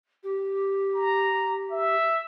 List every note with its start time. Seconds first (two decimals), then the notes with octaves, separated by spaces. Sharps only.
0.23 G4
0.94 A#5
1.71 E5